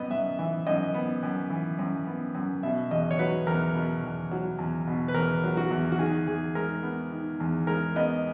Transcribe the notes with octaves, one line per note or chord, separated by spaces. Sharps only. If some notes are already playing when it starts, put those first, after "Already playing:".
Already playing: F#2 B3 D#5
F#2 E5
E3 E5
F#2 D#5
B3
F#2
E3
F#2
B3
F#2
B2 E5
E2 D#5
C#5
F#3 B4
E2 A#4
B2
E2
F#3
E2
B2
B4
E2 A#4
F#3
F#4
E2
F#4
D#3 G#4
E2 G#4
G#3 A#4
B3
D#3
E2
G#3 A#4
B3 D#5